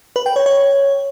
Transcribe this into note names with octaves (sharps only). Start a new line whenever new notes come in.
B4
G5
C#5
C#5